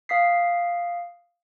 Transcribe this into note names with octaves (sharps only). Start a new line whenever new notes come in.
F5 D#6 B6 C7